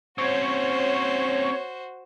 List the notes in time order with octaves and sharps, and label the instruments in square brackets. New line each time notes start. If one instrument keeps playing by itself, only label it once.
[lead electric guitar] C4 C#4 [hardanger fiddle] F#4 C5 [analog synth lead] C#5